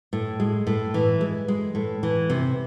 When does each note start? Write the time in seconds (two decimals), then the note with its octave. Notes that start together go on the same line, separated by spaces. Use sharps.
0.13 A2
0.40 G#3
0.67 A2
0.94 E3
1.21 G#3
1.48 G#3
1.75 A2
2.03 E3
2.30 C3